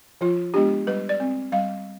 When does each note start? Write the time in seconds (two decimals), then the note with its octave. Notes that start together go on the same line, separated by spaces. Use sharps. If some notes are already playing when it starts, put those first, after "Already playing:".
0.21 F3 F4
0.54 G#3 B3 D4 G4
0.87 G3 B4
1.09 D5
1.20 C4
1.52 G3 F5